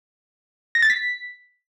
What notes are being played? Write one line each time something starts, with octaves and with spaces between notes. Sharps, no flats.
A#6
A6
B6